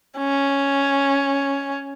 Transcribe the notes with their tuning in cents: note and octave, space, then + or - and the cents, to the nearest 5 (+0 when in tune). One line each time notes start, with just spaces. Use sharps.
C#4 +0